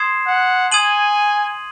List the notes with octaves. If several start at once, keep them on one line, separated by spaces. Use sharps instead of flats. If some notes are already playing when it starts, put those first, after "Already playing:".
Already playing: C6 D#6 G#6 C7 E7
F#5
G#5 D#6 G#6 D#7 F#7